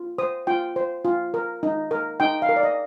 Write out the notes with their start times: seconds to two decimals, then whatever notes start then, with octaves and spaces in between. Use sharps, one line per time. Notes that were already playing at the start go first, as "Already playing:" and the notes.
Already playing: F4
0.18 C5 D#6
0.47 F4 G5
0.76 C5
1.05 F4
1.34 A#4
1.63 D#4
1.91 A#4
2.20 D#4 G5
2.42 F5
2.49 A#4
2.56 D5
2.63 D#5